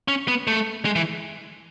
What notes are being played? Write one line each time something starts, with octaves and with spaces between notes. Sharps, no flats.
C#4
B3
A3
G#3
E3